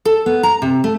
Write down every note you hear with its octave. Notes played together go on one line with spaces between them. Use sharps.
A4
B3
A#5
C3
A3